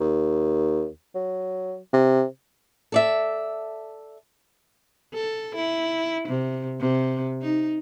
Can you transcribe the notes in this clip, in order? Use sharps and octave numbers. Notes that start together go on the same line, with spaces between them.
D#2
F#3
C3
A4 D5 E5
A4
E4
C3
C3
D#4